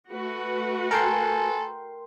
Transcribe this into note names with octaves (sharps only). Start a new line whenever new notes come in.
A3 F#4 B4
A4 A#4 G5 G#5 C6